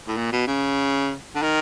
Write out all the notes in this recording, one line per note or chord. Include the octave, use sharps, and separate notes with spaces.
A2
A#2
B2
C#3
D3
D#3